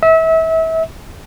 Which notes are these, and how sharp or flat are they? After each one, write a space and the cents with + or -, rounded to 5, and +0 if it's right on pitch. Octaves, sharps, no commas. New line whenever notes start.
E5 -30